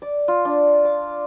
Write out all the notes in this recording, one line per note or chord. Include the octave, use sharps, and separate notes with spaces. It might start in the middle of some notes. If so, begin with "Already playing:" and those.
D5
F4
D4
D6